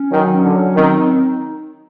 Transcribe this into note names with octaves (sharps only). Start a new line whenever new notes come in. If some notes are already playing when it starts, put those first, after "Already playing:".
Already playing: C#4
D#3 F#3
C#4
D3
F#3
D#3 C4
D#4